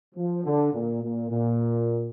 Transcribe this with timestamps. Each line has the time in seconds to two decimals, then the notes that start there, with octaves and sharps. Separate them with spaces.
0.15 F3
0.44 D3
0.73 A#2
1.02 A#2
1.30 A#2